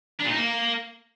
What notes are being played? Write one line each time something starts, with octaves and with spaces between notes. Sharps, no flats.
D4
A#2
D#4
A#3